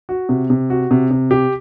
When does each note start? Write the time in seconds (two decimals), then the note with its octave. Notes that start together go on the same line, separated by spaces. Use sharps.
0.09 F#4
0.29 C3
0.50 C3
0.70 F#4
0.91 C3
1.11 C3
1.31 G4